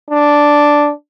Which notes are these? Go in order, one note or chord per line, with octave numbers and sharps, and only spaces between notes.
D4